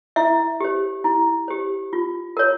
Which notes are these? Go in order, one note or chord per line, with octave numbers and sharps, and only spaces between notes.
E4 E5
G4 C5
E4
G4 C5
F4
A#4 C#5